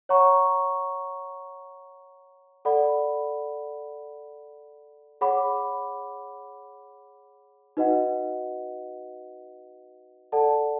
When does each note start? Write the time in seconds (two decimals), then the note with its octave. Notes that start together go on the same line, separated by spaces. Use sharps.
0.09 C#5 F#5 A#5 C#6
2.65 A4 D5 F#5 B5
5.21 G#4 C#5 F#5 B5 D6
7.77 D#4 F#4 B4 D#5 F#5
10.32 A4 D5 F#5 A5